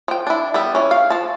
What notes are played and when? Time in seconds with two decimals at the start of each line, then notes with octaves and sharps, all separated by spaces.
0.08 F3 G5
0.27 D4 E4
0.54 G3 B3 E5
0.75 E3 C#4
0.91 F5
1.10 F3 A5